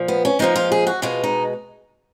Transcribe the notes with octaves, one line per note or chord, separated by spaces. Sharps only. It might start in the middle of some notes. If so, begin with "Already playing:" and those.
Already playing: A#2 F3
B3
C#4
A#2 F3 G#3 D#4
F4
G#4
F#4
B2 G#3 F4
D#4